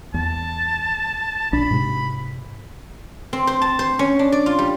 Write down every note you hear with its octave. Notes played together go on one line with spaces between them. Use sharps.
E2 A5
A#1 D4 B5
G#2 C3
C4
C5
A5
C5
C#4
D4
D5
F4
G3